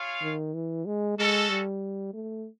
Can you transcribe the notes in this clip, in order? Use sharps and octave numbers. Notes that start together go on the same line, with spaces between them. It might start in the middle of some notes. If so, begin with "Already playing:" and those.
Already playing: F4 G#4 C#5 F5
D#3
E3
G#3
G#3 C#4 F#4 A4
G3
A3